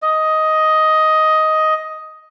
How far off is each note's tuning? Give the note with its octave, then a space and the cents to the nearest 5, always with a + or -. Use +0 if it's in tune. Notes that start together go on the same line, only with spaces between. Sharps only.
D#5 +10